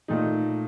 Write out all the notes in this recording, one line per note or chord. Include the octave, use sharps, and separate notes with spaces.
A#2 A3 D#4